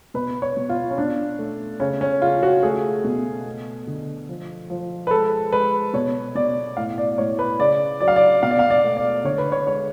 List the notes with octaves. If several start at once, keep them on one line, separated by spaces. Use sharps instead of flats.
B2 B4
C#5
B2
F4
C#4
B2 D4
A3
C#3 C#4
C#4
C#3 F4
F#4
A3 G#4
B2
A3
D3
F3
F3
B4
G#3 A4
G#3 B4
B2 C#5
B2 D5
A2 F5
D5
A2 C#5
B4
C#3 D5
F#3 D5
F5
D5
B2 F5
D5
F5
D5
A3
D5
D3 C#5
B4
C#5
G#3 C#5